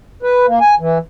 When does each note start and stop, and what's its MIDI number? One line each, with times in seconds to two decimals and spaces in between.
0.23 0.46 71
0.47 0.59 58
0.61 0.75 80
0.80 0.98 52